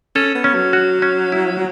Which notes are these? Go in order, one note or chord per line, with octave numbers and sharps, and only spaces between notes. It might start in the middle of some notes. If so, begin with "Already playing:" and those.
C#4 A4
B3
C#4
F#3
F#4
C#4
E4